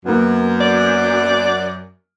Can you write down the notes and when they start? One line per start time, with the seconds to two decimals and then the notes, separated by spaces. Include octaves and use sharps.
0.06 F#2 A#3 B3
0.61 D5